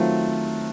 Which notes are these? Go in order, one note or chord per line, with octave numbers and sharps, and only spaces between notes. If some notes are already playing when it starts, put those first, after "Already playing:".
Already playing: D#3 F#3 A3 C4 F4